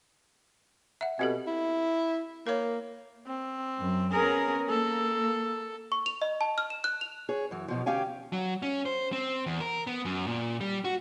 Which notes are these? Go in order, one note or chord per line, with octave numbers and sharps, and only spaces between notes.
E5 F#5
B2 C4 G4 A4
E4
A#3 A#4 C#5
C4
F#2
B3 C#4 G#4 A#4
A#3 A4
C#6
F7
D#5
A5
F6
E7
F#6
F7
G#4 C#5
F#2 E3
F#2 B2 F3
D2 C#4 G4 F5 G5 G#5
F#3
C#4
C5
C4
E2
A#4
B3
F#2
A#2
G3
F#4